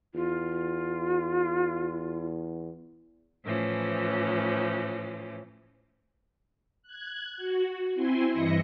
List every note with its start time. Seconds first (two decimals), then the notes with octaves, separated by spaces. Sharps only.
0.14 E2 F4
3.44 A2 E3 F3 C#4
6.83 F#6 G#6
7.37 F#4
7.94 C4 E4 G#5 C6
8.31 G2 E3 E4 D#5 A#6 C#7